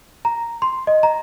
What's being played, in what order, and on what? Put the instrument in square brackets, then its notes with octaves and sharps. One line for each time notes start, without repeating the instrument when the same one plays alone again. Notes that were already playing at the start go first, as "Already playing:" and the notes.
[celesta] A#5
C6
D#5
A#5